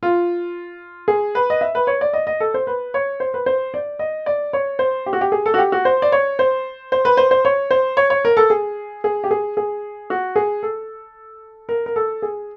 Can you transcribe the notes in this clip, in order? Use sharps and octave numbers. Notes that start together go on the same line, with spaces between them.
F4
G#4
B4
D#5
E5
B4
C#5
D5
D#5
D#5
A4
C5
B4
C#5
C5
B4
C5
D5
D#5
D5
C#5
C5
G4
F#4
G4
G#4
A4
F#4
G4
F#4
C5
D5
C#5
C5
C5
B4
C5
C5
C#5
C5
C#5
C#5
A#4
A4
G#4
G#4
G4
G#4
G#4
F#4
G#4
A4
A#4
A#4
A4
G#4